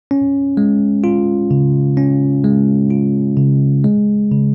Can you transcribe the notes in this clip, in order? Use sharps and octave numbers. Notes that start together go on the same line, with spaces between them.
C#4
G#3
F4
C#3
C#4
G#3
F4
C#3
G#3
C#3